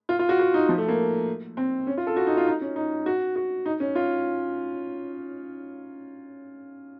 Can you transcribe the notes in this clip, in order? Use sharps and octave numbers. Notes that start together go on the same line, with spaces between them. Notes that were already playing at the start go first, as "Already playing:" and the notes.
F4
F4
F#4
F#4
D#4
F3
A3
A#3
C4
C#4
F4
A4
F#4
D#4
F4
D#4
C#4
D#4
F#4
F#4
D#4
C#4
F4